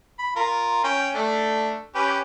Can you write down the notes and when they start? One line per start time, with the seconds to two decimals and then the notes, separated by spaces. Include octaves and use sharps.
0.19 B5
0.36 F4 A#4
0.84 C#4 G5
1.15 A3 D4 A4
1.95 C#4 G4 B4